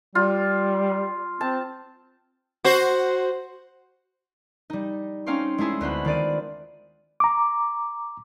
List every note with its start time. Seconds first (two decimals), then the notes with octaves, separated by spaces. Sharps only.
0.15 G3 F4
1.41 C4 A5
2.64 F#4 C5
4.70 G3 D#4
5.26 C4 C#4 D#4 F5 G5 C6
5.58 G#3 A3 E4 G#4
5.81 D2 B3 C5 B5
6.05 D#3 F4 D5 D#7
7.20 A#5 D6